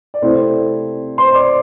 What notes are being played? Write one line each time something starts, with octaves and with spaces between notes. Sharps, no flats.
D5
C3 A3 C4 E4 C5
C5 C6
D5 D6